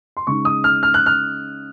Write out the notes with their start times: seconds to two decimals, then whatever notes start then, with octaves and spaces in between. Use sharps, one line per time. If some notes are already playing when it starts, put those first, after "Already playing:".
0.17 C6
0.27 C#3 G#3 D#4 C#6
0.45 D#6
0.64 F6
0.83 F6
0.94 F#6
1.06 F6